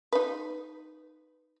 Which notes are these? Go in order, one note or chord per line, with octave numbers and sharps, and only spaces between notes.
D#4 B4